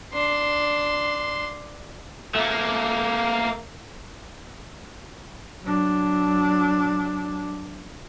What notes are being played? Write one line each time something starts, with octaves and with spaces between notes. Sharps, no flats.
D4 C6
A3 A#3
F#3 D4